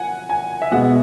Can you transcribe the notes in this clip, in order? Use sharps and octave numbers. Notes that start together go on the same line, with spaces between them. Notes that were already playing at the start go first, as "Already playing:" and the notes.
Already playing: F#5 G#5
G#5
E5
B2 G#3 B3 F#5